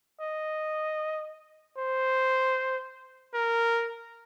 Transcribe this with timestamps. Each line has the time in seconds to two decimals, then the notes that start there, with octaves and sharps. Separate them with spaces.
0.21 D#5
1.78 C5
3.34 A#4